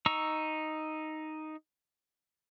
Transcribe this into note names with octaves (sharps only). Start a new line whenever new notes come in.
D#4 A#5 C#6 E6